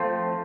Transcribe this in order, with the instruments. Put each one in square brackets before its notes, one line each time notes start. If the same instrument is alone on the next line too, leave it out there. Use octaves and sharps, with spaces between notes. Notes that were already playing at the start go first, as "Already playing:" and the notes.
Already playing: [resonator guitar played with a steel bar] F3 A3 C4 F4